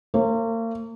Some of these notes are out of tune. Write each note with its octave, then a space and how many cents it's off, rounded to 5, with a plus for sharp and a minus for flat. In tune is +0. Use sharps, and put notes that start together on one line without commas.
A#3 -40 C5 +45